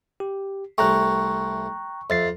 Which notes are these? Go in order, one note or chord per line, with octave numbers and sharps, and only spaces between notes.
G4
C2 A3 G5 A#5 C#6 F#6
F2 E5 A6 C7